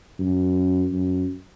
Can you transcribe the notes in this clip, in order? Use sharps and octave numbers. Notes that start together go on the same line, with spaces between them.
F#2
F#2